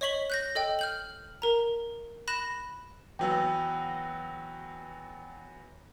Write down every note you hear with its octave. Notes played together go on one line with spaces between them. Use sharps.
C#5 D#5 C#6 B6 F#7 G7
F#6 G6 A#6
A4 D#5 G5
F6 G6 F#7
A#4 A#5
B5 F#6 A#6 E7
E2 F#3 B3 G5 E6